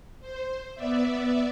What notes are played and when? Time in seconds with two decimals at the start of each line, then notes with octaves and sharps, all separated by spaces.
0.21 C5
0.75 B3 D5 E5